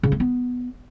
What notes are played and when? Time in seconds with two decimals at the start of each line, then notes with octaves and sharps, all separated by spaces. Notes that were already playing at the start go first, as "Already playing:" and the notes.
0.03 C#3
0.12 A3
0.20 B3